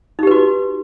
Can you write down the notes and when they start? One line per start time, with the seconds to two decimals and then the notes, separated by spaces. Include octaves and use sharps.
0.19 D#4
0.23 G4
0.27 B4
0.31 F#4